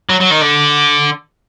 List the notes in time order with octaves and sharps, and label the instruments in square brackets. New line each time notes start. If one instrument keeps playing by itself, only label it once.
[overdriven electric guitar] F#3
F#3
D#3
D3